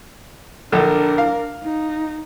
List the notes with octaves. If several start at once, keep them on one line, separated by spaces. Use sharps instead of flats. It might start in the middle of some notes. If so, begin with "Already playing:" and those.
A#1 D3 D4 A#4
F5
D#4